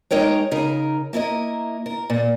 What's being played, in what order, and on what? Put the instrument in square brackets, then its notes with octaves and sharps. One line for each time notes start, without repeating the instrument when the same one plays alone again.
[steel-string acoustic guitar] G#3 D#4 A#4 C#5 G5
C#3 D#4 A#4
A#3 E4 A#4 D#5
A#4
A#2